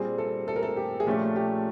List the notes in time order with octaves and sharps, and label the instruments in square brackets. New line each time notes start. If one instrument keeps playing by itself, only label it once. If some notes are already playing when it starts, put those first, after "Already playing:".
Already playing: [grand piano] A#2 G3 C4 [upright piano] G#4
[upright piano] A4
A4
A#4
A4
G4
G#4
[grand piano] A#2 F3 A3 C#4 [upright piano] G4
[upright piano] G4